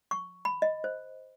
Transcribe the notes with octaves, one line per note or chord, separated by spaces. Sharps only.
C#6
B5
D#5
C5